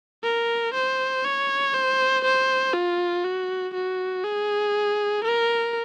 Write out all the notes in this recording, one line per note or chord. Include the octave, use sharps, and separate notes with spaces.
A#4
C5
C#5
C5
C5
F4
F#4
F#4
G#4
A#4